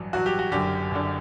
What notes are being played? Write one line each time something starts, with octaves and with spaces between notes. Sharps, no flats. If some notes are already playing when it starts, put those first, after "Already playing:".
Already playing: A1 G2 F#3
A1 G2 F#3 F#4
G4
F#4
F#1 F#2 D3 G4
F#1 F#2 D3